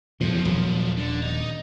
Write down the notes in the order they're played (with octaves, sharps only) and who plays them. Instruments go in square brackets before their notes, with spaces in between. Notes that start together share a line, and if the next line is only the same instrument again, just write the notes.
[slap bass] E2 A2 [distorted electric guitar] F3 F#3
[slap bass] D#1 A#2
[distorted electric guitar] D3
D#4